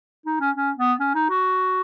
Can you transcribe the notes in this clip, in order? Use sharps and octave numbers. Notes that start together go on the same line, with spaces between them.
D#4
C#4
C#4
B3
C#4
D#4
F#4